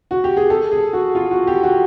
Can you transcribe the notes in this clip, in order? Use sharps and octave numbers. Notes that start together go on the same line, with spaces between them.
F#4
G4
G#4
A4
G#4
F#4
F4
F#4
G4
F#4